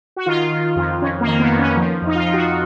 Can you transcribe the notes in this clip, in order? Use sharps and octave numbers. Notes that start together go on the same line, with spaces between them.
F#4
D#3 F4
D#3
F2
F2 C#4
A#3
D#3
B3
F2
C#4
F3
F2
D#4
F4
F3
F#4